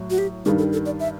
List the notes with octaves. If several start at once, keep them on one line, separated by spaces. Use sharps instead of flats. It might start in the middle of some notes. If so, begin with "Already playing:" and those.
Already playing: A2 F#3
F#4
G4
G2 D#3 G3 G#4
A4
A4
D5
E5